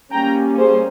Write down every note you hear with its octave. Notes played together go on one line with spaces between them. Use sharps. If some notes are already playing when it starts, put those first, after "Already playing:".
G3 A#3 C#4 G5 A#5
G#4 C5